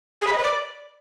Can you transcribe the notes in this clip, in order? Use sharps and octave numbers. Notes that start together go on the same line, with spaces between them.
G#4
B5
D#5
B4
D5